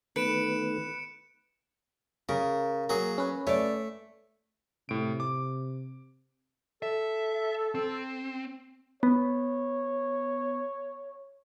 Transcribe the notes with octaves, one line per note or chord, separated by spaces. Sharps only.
D#3 A3 B3 B4 C#7 D7 E7
C#3 A#4
F#3 A#3 G#4
C#4 B4
A3 C#5 D5
A2 C3 D7
D6
A4 E5
C4
B3 C#5